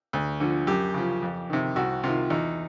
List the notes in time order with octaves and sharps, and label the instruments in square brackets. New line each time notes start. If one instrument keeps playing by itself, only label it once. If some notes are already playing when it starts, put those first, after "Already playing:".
[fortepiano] D2
D3 F3
F#2 G4
C#3 F3
F2
C3 D#3
C2 F#4
C3 D#3 F4
E2 D#4